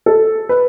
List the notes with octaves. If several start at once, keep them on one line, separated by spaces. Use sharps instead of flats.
A4
B4